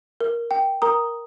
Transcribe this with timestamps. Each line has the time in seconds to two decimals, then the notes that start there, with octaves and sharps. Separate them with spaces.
0.20 A#4
0.51 G5
0.82 A#4 A#5 D#6